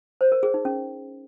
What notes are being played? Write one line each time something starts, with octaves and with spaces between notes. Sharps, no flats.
C5
A#4
G#4
D#4
C#4